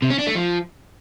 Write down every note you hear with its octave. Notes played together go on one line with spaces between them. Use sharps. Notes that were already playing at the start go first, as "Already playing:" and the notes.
C3
C#4
D4
A3
F3